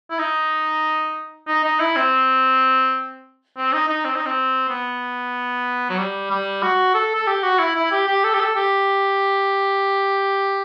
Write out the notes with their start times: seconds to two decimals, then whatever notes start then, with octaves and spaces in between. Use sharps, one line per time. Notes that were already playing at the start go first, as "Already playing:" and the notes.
0.11 E4
0.19 D#4
1.48 D#4
1.64 D#4
1.80 E4
1.96 C4
3.57 C4
3.73 D#4
3.89 D#4
4.05 C4
4.15 D#4
4.26 C4
4.69 B3
5.90 F#3
5.99 G3
6.31 G3
6.63 F#4
6.95 A4
7.15 A4
7.27 G4
7.43 F#4
7.60 E4
7.76 E4
7.92 G4
8.08 G4
8.24 A4
8.34 G4
8.40 A4
8.56 G4